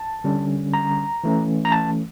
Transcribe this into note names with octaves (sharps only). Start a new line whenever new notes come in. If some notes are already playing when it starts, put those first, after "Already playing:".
Already playing: A5
D3 G3 C#4
A#5
E3 A3 C#4
A#5
A5